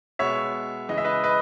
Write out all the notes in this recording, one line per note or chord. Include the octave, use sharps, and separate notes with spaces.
B2 G#3 B3 C#5 E5
C#3 E3 G#3 D#5
E5
B4 D#5
B4 D#5